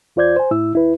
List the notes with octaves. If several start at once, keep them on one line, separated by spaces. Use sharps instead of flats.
E2 F4 C5 D5 G6 G#6
C5 G#5
A2 E4 E6
D#2 E4 B4